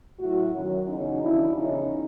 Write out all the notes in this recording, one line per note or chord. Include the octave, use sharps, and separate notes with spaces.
A2 F#3 E4 F#4
F#2 D#3 F#3
E2 C#3 F#3 C#4 D#4
D#2 D#3 F#3 D4 E4
E2 C#3 F3 C#4 D#4